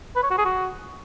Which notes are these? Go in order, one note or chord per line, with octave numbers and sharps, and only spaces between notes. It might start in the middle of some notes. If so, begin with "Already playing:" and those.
B4
C#5
F#4
G#4
F#4